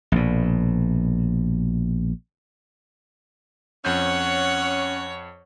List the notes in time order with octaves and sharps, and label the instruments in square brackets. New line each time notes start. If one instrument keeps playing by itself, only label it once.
[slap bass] A#1 B2
[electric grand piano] F2 G6 [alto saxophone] C#4 [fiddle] C#5 [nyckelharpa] F#5